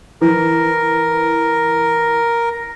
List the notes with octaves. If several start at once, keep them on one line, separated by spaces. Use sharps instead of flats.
E3 A#4